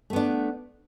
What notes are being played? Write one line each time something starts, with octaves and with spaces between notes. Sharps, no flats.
A3 B3 D4